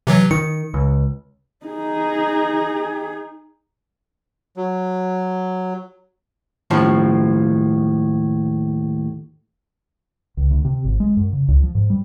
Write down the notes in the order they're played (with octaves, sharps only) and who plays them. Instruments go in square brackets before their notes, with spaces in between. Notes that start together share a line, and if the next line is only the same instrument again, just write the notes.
[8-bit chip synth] C3 E3 F#3
[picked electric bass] D#3 [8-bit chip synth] C#7
[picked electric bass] C#2
[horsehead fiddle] D#4 G#4
[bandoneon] F#3
[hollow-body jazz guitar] D#2 A2 F3
[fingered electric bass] C#2
D2
C3
G#1
G#3
F#2
C#3
C#2
F3
G#2
G3